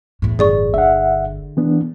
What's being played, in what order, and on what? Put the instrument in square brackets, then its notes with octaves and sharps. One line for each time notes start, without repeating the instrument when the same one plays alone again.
[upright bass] E2 A2
[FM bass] G1 [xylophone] G#4 D5 C#6
[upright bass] D3 [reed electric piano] E5 F#5
[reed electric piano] E3 B3 D4